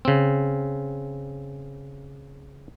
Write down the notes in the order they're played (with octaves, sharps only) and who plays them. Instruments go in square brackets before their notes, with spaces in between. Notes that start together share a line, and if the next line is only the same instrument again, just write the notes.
[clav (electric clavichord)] C#3 C4